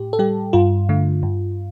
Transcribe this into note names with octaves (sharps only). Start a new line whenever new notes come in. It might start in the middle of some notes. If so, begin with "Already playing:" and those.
Already playing: A2 G4
A4
G3 G4
G2 F4
D3 A3
G2